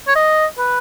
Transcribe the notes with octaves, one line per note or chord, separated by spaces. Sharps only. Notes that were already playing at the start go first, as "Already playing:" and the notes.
C#5
D#5
B4